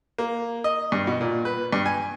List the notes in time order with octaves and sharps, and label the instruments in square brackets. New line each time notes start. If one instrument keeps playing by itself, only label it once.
[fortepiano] A#3
D#5
G2
B2
A#2
B4
G2
G#5